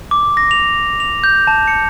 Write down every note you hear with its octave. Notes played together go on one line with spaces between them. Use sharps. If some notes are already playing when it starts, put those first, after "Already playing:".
D6
A#6
F7
F7
G6
A5
C#7